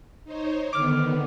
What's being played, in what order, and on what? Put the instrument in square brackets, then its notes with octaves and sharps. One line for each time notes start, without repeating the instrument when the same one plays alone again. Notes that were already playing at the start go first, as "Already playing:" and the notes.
[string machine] D#4 C5 C#5
[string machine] D3 D#3 B3 [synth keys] D6 F6